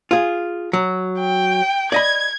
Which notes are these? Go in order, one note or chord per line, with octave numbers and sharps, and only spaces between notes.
F4 G#4
F#3
G5
D5 D#5 B5 G#6